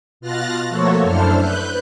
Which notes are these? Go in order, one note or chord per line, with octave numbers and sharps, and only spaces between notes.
B2 F4 F6 F#6 A6 A#6
F3 A3 A#3 F#4 A4 C#5
F#2 D4 E4 A4 C5 F6
B4 F#6 G6